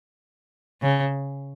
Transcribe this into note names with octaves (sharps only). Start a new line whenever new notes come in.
C#3